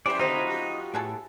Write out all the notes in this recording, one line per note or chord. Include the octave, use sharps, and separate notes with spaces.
F2 E3 G3 G4 C5 D5
B2 D3 A3 D#4 F4 F#4 C5 B5
F2 G4
A2 B3 G#4 A4